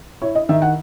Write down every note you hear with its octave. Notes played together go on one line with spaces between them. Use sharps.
E4 C#5
D#5
D#3 E5
F#5